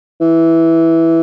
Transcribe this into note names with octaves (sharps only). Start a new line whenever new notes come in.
E3